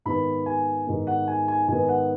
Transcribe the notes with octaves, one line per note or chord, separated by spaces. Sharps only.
G#2 D#3 B3 B5
G#5
G#2 D#3 B3
F#5
G#5
G#5
G#2 D#3 B3 G#5
F#5